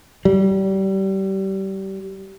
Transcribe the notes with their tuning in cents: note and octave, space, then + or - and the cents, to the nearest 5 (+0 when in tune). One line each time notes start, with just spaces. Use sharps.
G3 -25